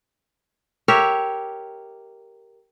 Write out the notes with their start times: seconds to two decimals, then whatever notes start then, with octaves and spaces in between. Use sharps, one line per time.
0.88 G4 A#4 C#5 E5